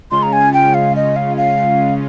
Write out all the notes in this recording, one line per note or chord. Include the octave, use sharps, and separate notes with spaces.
C#3 G#3 C#4 F4 C6
A#5
G#5
G5
F5
D#5
F5
F5